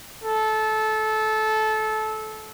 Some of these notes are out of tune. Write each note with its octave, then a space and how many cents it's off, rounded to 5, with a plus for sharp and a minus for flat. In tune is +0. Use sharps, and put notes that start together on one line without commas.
A4 -20